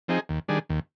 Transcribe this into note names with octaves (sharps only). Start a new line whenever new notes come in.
F3 C4 D#4 G#4
D#2
D#3 G3 D4 G#4
D#2